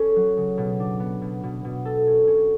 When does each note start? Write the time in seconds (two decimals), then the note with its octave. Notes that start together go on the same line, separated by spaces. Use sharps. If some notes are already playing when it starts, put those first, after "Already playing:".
Already playing: C#4 A4
0.16 F#3
0.37 C#3
0.58 B2
0.80 D4
1.00 B3
1.22 B2
1.43 B2
1.65 B2
1.85 A4
2.07 C#4
2.27 C#4